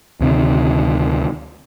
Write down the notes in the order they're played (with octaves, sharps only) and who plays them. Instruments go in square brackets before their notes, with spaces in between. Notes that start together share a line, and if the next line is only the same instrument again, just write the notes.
[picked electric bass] D2 C3 D#3